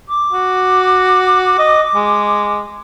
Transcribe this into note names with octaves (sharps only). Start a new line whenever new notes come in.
D6
F#4
D#5
G#3